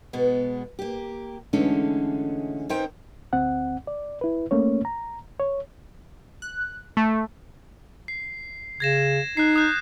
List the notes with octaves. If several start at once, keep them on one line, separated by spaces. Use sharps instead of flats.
B2 G#3 B3
A#3 G4
D3 E3 G#3 A3 C#4 D#4
C4 C#4 D#4 A#4 C5 G5
D2 C4 F#5
D5
E4 B4
A3 A#3 C#4 C#5
A#5
C#5
F#6
A3
C7
C#3 G#6 A#6 E7
D#4 F#6 C7
D#6 F#6 G6